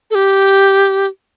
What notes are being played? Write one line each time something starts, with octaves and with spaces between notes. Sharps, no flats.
A4
G4